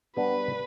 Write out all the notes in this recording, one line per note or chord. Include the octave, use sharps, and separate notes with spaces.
G3 B3 D4 G4 B4